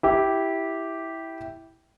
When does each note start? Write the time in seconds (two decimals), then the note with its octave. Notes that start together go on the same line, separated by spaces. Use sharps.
0.03 E4 G4